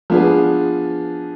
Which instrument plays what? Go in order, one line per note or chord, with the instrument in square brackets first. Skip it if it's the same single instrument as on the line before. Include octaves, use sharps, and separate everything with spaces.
[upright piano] F3 B3 D4 G#4